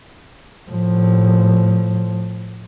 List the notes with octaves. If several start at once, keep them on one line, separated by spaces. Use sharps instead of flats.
A2 F3